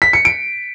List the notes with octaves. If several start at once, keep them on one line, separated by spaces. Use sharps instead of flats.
B6
C#7
D7